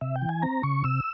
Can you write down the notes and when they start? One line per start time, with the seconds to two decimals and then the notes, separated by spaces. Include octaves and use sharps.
0.01 C3 E5
0.16 G5
0.22 E3
0.29 G#5
0.42 C4 A#5
0.63 C#3 C#6
0.84 C3 E6